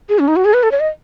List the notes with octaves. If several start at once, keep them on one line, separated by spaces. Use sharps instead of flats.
G#4
C#4
D#4
F#4
G#4
B4
A4
C#5
D#5